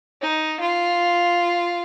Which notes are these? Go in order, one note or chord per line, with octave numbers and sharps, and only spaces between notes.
D#4
F4